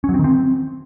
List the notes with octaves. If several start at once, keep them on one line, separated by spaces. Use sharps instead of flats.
C#4
F#3
C4
D#3
C4